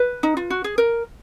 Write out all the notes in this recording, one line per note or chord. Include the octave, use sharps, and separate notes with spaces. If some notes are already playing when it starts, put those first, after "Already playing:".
Already playing: B4
D#4
F4
F#4
G#4
A#4